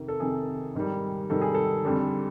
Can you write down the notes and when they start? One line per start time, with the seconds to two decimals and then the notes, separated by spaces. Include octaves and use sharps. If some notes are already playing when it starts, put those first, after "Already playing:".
Already playing: F2 C3 D#3
0.08 A4
0.20 F2 C3 D#3 G#4
0.75 G#2 D#3 G3
1.30 G#2 D#3 G3 A4
1.42 G#4
1.54 A4
1.85 F2 D3 G3